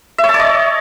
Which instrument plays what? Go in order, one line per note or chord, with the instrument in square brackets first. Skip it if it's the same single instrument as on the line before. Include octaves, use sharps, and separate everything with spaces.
[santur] E5
C#5
A5
C#5
D#5